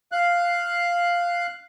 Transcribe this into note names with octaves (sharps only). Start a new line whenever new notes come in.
F5 F#6